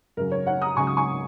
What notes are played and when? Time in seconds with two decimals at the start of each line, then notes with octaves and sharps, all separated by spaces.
0.17 F#2 C#3 F#3 A#4
0.32 C#5
0.46 C#5 F#5
0.62 A#5 D#6
0.77 C#2 C#3 F#3 G#5 C#6
0.87 D#6
0.97 G#5 C#6